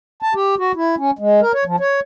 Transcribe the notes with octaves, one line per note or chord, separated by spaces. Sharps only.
A5
G4
F#4
E4
C#4
G#3
A#4
C#5
F3
C#5